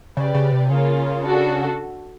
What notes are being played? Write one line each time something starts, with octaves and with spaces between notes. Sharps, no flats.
C#3 G4 B4 D5
C#3
C3
C#3 A#3 C#4 F4
D4 F#4 A4